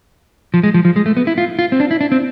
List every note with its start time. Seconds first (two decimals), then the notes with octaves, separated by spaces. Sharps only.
0.54 F3
0.63 G#3
0.74 F3
0.85 F3
0.96 G#3
1.06 A3
1.17 B3
1.27 E4
1.38 F4
1.59 F4
1.72 C4
1.80 D4
1.91 E4
2.01 D4
2.12 C4